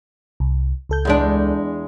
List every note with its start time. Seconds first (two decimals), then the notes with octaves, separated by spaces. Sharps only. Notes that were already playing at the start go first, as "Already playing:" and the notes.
0.40 C2
0.89 C#2 A4 G6
1.05 E2 G#3 D4